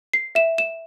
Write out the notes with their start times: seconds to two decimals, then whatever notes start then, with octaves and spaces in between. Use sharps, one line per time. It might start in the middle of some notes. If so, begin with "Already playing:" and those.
0.13 C7
0.35 E5 E7
0.58 E7